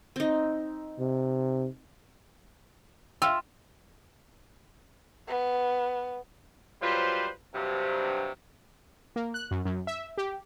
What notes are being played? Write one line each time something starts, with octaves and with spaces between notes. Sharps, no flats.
C4 D#4
C3
F4 E5 F5 G5 E6
B3
F#3 G3 F4 B4 C5
G2 C3 F#3
A#3
F#6
F#2
F#2
E5
G4